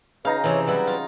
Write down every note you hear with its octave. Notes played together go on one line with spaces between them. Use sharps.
C#3 D#4 B4 F5 A#5
C3 E3 C#5
F#3 G3 E4 B4
F4